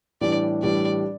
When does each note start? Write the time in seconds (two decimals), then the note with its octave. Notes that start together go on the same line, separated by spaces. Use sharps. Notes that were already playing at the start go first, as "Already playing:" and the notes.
0.21 A2 E3 G3 D4 G4 D5
0.62 A2 E3 G3 D4 G4 D5